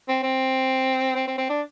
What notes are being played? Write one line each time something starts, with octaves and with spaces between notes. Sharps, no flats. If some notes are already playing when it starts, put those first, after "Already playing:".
C4
C4
C4
C4
C4
D4